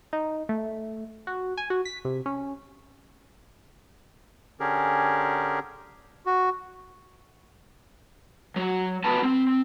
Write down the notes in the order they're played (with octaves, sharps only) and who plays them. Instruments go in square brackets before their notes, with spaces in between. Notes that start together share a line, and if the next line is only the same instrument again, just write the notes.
[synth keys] D#4
A3
F#4
G#5
F#4
B6
C3
C#4
[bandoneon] D3 C#4 G4 G#4 A#4
[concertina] F#4
[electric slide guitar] F#3
E2 B3 F#4 B4 A5
C4